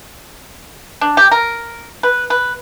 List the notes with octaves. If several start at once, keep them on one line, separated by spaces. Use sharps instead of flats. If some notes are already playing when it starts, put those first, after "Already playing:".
D4
G4
A#4
B4
B4